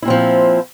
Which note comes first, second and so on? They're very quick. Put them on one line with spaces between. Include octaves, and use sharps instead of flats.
E4 A#2 C4 F3